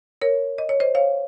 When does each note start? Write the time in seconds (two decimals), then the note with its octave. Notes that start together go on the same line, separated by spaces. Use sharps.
0.21 A#4 C#5
0.58 D#5
0.69 C#5
0.80 C5 D#5
0.95 C#5 F5